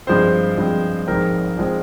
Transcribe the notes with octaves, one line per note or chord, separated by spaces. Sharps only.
G2 F3 G#3 C4 C5
G2 F3 G#3 C4
A#1 G#2 F3 G#3 C4 A#4
A#1 F3 G#3 C4